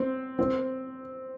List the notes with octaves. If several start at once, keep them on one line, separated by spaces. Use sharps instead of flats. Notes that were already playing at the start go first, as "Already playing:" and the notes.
Already playing: C4
C4